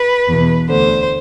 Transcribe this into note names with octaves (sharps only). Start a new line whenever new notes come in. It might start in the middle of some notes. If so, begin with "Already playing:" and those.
Already playing: B4
E2 B2
D2 D3 C5